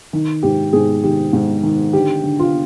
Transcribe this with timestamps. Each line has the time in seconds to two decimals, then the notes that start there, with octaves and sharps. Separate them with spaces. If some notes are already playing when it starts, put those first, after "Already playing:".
0.13 D#3
0.43 G#2 G4
0.73 G#2 G#4
1.04 D#3 G4
1.33 G#2
1.63 D#3
1.93 D3 G4
2.24 D3
2.39 F4